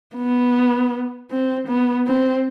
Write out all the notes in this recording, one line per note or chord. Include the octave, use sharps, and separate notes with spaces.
B3
C4
B3
C4